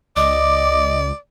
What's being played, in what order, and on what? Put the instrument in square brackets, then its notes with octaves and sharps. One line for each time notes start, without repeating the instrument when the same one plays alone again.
[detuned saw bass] C#2 [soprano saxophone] D5 [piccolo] D#5 [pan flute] D6